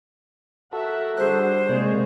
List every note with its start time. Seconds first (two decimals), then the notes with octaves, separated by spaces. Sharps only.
0.73 F#4 A4 A#4 E5 F#5
1.17 D3 G3 G#4 C5 F#6
1.69 C3 G#3 A#3 G#4 C#5 D5